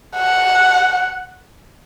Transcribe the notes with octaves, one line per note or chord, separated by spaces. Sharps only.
F#5